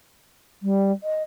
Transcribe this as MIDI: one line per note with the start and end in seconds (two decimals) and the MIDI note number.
0.62 0.91 55
1.03 1.23 75